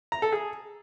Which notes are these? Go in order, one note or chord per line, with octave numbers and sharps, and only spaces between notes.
A#5
A4
G#4